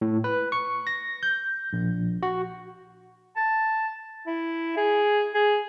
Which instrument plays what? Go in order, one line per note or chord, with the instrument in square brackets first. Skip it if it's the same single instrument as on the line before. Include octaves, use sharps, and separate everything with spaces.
[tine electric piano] A2
B4
C#6
A#6
G6
A#1
F#4
[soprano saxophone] A5
E4
G#4
G#4